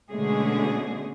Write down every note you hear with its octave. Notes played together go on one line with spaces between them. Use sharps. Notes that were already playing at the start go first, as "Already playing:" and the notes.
B2 D3 G#3 A3 C#4 G#4